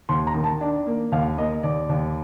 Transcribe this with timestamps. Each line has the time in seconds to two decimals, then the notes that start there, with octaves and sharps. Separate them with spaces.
0.09 D#2 C6
0.27 A#5
0.34 D#3
0.44 A5
0.61 D4
0.86 A#3
1.12 D#2 F5
1.37 A#3 D#5
1.63 D#2 D5
1.89 D#2